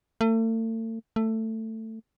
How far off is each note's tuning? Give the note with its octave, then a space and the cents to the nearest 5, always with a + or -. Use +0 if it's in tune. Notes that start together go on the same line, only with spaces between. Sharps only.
A3 +40
A3 +15